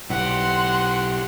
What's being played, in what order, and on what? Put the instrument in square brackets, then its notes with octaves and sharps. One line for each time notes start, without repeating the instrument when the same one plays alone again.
[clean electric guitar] B1 [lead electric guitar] E4 G4 [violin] F#5 C6